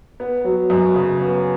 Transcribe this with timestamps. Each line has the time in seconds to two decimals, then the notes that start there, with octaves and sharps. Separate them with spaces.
0.20 B3
0.44 F#3
0.70 F#2
0.94 C#3
1.20 B3